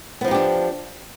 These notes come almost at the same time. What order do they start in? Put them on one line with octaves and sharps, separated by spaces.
B3 F3 D#4 G4 D4